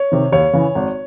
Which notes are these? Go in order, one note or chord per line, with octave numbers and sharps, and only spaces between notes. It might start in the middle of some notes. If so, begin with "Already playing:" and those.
Already playing: C#5
C3 D#3
D#2 C#5
C#3 E3
G#1